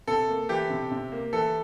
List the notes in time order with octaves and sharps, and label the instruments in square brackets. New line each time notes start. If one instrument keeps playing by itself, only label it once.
[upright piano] C3 [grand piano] A4
[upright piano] A#3
[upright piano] E3 [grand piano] G4
[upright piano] C3
C3
A#3
[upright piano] E3 [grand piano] A4